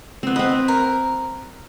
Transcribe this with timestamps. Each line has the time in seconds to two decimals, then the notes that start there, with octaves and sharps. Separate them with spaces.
0.23 B3 C4
0.36 C4 B4 D#5
0.68 A#4